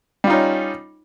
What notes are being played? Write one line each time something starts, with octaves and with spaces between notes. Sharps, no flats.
G3 C#4 D#4 F4